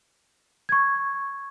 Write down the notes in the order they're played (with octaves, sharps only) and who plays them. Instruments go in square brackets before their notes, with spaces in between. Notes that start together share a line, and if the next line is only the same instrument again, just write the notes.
[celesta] C#6 G#6